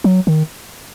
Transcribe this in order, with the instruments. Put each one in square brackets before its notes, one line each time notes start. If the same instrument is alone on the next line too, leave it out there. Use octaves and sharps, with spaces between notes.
[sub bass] F#3
D#3